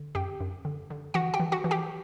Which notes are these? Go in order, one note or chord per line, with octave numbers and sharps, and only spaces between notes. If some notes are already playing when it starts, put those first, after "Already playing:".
Already playing: D3
F#2 G4 G5
F#2
D3
D3
E3 F#4 F#5
G4 G5
E3
F#4 F#5
E3
G4 G5